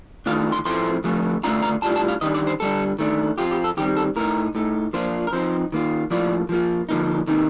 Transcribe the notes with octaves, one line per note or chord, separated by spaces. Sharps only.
D#3 A3 D4 F4 F5
C6
A2 F3 A3 C4 C6
D3 F3 A3
D3 A3 D4 F4 A#5
A#5
A2 G3 D4 F4 A5
A5
F5
D#3 G3 D4 D#5
D5
C5
D3 G3 D4 A4
D#3 A3 D4
F3 C4 F4 G4
G4
A4
D#3 G3 C4 G4
A4
A2 A3 D#4 A#4
A2 A3 D#4
F3 A#3 D4 F4 C5
A#4
F3 C4 D#4 C5
D#3 A#3 F4
A2 F3 A#3 F4 D5
F3 A#3 F4
D3 F3 A#3 D#4
C3 D#3 A#3 D#4